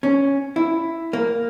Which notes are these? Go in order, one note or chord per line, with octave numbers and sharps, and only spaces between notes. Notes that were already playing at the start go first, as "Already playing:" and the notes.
C#4
E4
A#3